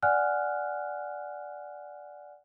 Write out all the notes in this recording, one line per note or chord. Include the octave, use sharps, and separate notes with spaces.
D5 F#5 G#5 F6 F#6